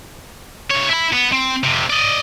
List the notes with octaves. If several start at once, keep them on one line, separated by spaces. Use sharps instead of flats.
G2 C#5
E4 B5
B3
C4
F2 C3
D5 D#5